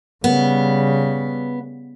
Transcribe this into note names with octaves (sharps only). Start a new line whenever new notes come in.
C#3 G3 B3